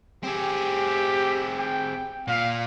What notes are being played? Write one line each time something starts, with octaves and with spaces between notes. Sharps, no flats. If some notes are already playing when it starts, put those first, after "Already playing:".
C4 G4 G#4
G5
A#2 F5